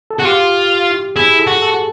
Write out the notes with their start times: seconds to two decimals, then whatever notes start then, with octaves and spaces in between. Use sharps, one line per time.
0.11 A4
0.17 F#4 G#4
0.24 F4 G4
1.16 E4 G#4
1.39 A4
1.47 F#4
1.62 A4